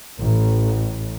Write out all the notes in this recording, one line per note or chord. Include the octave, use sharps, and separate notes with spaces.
A1